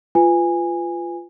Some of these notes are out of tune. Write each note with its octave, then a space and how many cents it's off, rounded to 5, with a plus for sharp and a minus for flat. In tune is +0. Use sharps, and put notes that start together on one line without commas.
F4 -10 B4 +20 G#5 -15